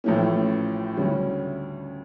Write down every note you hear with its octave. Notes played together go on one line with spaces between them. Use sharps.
A1 A2 F3 A3 C#4
D2 C#3 G3 C#4